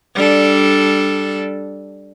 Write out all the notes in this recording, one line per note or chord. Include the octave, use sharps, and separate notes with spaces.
G3 D4 A4